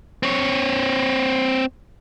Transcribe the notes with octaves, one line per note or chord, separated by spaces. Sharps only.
C4 C#5